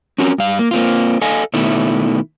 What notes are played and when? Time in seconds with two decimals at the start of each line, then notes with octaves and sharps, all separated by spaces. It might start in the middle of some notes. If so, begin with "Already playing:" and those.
0.18 C4 C#4 F#4 A#4
0.38 G2 F5
0.59 A#3
0.71 A#3 C4 F4
1.21 A4 D#5 F5 G#5
1.54 B2 D#3 A3 E4